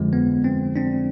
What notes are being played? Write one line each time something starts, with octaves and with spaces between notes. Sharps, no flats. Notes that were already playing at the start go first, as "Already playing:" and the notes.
Already playing: F2 D3 F3 G#3
B3
C4
C4 D4